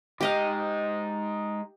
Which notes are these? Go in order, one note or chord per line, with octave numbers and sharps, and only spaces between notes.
G#3 D#4 G4 D#5 F5